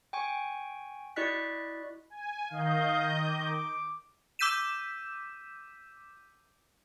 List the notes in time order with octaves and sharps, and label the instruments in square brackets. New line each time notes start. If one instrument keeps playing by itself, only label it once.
[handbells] G5 G#5 C#6
E4 F#4 D5 D#5 F#6 B6
[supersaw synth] G#5
[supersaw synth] D#3 D#5 G6 [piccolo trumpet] F5
[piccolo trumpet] D6
[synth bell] D6 E6 G6 B6 D#7 E7